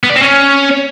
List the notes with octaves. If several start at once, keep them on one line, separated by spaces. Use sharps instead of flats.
B3
D5
C4
C#4